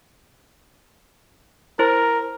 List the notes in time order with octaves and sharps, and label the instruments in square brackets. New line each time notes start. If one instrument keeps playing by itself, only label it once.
[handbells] E4 C5 C6 [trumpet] A#4